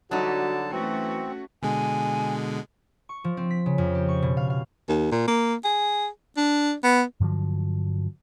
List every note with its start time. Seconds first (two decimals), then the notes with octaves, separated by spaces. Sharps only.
0.11 D3 F#3 G3 D#4 F#4 A5
0.72 E3 A3 C4 C#4 F#4
1.63 B2 D3 G#3 G#5
3.09 C#6
3.24 F3
3.37 C4
3.50 B6
3.66 C#3
3.78 F2
3.95 G4
4.09 C#6
4.22 B2
4.37 F5
4.50 F5
4.89 D#2
5.12 A#2
5.28 A#3
5.64 G#4
6.37 D4
6.83 B3
7.20 G2 D3 F3 F#3